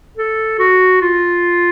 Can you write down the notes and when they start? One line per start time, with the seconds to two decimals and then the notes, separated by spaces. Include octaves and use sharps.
0.18 A4
0.59 F#4
1.01 F4